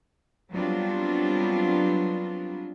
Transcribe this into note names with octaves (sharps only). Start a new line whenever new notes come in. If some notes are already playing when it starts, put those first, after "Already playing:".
F#3 G3 B3 C4 D4 F4